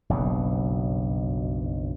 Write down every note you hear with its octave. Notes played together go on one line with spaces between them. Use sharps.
F#1 B1 G2 B2